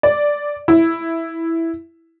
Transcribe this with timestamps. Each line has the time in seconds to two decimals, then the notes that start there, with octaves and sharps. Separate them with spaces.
0.03 D5
0.68 E4